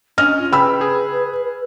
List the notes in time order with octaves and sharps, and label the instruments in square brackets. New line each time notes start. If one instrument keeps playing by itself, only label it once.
[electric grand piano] C#4 D#5 [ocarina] D4 [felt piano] F6
[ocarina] F4
[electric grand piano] C#3 G5 [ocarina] B4 [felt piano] B5 E6
[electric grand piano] G#4